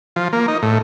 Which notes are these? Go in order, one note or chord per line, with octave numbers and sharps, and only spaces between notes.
F3
A#3
D#4
A2